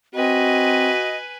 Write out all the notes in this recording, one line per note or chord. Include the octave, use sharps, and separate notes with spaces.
C4 F#4 B4 D#5 G#5